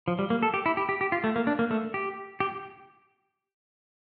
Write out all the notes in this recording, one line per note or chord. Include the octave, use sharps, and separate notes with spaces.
F3
G3
A#3
A4
G4
E4
G4
G4
G4
F4
A3
A#3
D4
A#3
A3
G4
G4